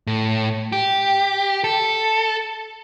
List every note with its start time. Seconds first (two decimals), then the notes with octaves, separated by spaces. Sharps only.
0.07 A2
0.72 G4
1.64 A4